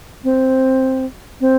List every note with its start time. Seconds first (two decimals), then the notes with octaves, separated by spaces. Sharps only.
0.24 C4
1.41 C4